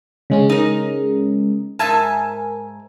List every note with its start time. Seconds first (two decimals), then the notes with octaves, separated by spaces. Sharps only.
0.30 C#3 G#3 C#4
0.49 D#4 A#4
1.79 G#2 A#4 E5 G#5 A5